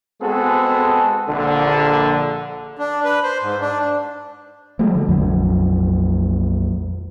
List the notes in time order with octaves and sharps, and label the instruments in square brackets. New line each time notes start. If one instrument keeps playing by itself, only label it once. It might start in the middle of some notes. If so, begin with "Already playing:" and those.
[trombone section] G#3 B3 C4 F#4 G#4 A4
A#1 D3 A4
[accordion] D4
B4
C5
G#2
D4
[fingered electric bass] F3 F#3 G#3 A3
D3
A#1 F2 F#3